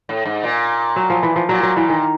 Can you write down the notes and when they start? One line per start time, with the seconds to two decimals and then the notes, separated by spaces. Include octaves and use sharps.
0.09 A2
0.26 G#2
0.44 A#2
0.96 F#3
1.10 F3
1.23 E3
1.36 F3
1.49 A#2 F#3
1.63 F#3
1.76 A#2 E3
1.89 D#3